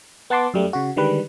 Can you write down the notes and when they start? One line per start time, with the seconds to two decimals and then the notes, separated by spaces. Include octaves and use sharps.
0.30 B3 F#5 A5 C6 D6
0.54 F#2 G3 A3
0.73 C#3 F#4
0.96 D3 D#3 G3 G#3 B4